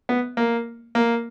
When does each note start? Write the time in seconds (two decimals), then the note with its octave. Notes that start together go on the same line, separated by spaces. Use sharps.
0.09 B3
0.37 A#3
0.95 A#3